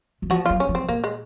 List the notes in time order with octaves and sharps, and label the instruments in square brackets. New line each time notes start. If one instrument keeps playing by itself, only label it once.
[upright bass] F#3
[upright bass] F3 [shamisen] F#4
[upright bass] F#3 [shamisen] F4
[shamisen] C#4
[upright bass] F3
[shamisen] C4
[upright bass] A#2 [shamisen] A#3
[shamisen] G#3